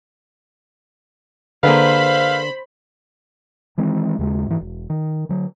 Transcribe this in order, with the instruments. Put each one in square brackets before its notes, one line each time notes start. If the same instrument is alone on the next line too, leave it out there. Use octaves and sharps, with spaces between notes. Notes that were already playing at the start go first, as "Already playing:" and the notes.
[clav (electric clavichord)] D3 [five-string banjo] A#3 G#4 B4 [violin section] C5 B5 [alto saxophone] F5
[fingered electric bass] D#3 E3 G#3 C4
D#2 C#3 G#3
G#2 E3
E1
D#3
D3 F#3